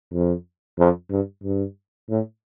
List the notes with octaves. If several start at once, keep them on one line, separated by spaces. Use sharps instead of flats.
F2
F2
G2
G2
A2